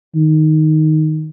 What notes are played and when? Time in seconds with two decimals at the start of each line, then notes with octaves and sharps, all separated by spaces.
0.15 D#3